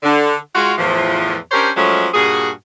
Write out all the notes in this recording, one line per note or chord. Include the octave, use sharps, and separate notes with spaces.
D3
G#3 F4 F#4
E2 A2 E3 F3
C#4 D4 G4 A#4 C5 C#5
F3 F#3 G#3 A3 C#4
G2 A#2 F#4 G#4